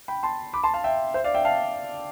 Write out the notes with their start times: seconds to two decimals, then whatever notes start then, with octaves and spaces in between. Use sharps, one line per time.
0.08 G5 B5
0.23 A5 C6
0.54 B5 D6
0.63 A5 C6
0.74 F5 A5
0.84 E5 G5
1.14 C5 E5
1.24 D5 F5
1.34 E5 G5
1.45 F5 A5